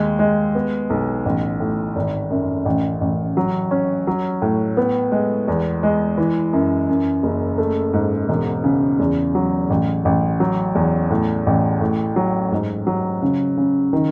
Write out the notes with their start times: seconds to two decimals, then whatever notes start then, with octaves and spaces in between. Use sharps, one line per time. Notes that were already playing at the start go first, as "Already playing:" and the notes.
Already playing: D#2 G#3
0.19 G#3
0.55 B3
0.90 B1
1.26 A1
1.60 A2
1.96 G#1
2.30 F#2
2.65 A1
3.01 A1
3.37 F#3
3.71 C#4
4.07 F#3
4.42 A2
4.77 B3
5.12 G#3
5.48 E2
5.83 G#3
6.18 E3
6.53 F#2
6.89 F#2
7.23 F#1
7.58 A3
7.93 G#2
8.29 E1
8.64 C#3
8.99 E2
9.35 F#3
9.70 A1
10.05 A1
10.40 F#3
10.75 E2
11.10 A2
11.47 A1
11.81 A2
12.16 F#3
12.52 G#2
12.87 F#3
13.22 C#3
13.57 C#3
13.93 D#3